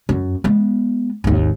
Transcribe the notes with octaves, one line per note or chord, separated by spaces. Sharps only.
F#2
G#3 B3
G#1 D#2